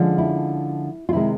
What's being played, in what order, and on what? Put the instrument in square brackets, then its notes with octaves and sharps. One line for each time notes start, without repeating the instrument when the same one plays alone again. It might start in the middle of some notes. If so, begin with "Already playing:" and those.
Already playing: [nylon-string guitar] D3 F3 G#3 C#4
E4
F4
C3 D#3 G#3 E4